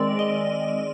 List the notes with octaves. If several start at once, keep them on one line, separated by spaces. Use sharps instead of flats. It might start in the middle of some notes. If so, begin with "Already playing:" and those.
Already playing: D#3 G#3 C4 D5
D#5